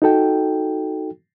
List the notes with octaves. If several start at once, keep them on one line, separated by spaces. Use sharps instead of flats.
D#4 F#4 A4 G5